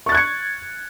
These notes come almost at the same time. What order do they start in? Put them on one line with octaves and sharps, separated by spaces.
C#6 A6 F#6 G#6 C#7